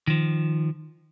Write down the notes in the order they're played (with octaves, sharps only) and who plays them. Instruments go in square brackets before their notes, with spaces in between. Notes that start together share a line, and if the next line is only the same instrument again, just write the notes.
[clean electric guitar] D#3 F3